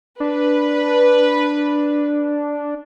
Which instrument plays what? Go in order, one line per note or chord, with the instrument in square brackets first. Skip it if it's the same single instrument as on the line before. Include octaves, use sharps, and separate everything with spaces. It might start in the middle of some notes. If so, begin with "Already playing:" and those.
[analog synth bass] D4 [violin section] B4